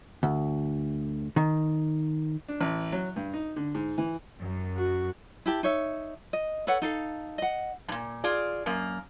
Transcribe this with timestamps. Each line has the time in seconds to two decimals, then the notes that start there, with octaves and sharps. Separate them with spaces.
0.23 D2
1.36 D#3
2.49 D4
2.61 A1
2.92 F#3
3.16 G2
3.33 D#4
3.56 D3
3.75 G#2
3.98 E3
4.39 F#2
4.77 F#4
5.46 E4 G4 A5
5.63 D#4 C#5 E5
6.33 D#5
6.67 A4 B4 C#5 F#5
6.82 D#4 A4 F5
7.38 D#5 F#5
7.88 G2 A#2
8.24 F4 G#4 D5
8.66 F#2 A#3